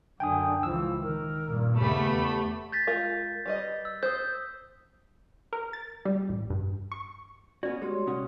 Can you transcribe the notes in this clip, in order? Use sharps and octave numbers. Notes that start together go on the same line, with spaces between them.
F#2 D3 G5 G#5 D#6
C#2 E3 F3 E6
D#3 A#4
G2 A#2
D#2 C#3 A3 B3 G4 B5
E2
G6 A6 B6
G#3 F4 A#4
G3 B4 D#5
E6
C5 D#6 G6
A#4
A6
G3
A1
G2
C#6
B3 C#4 F#4 D5
G#3 F#4 G4 C#5 C6
C2 C#4 F#5 D#6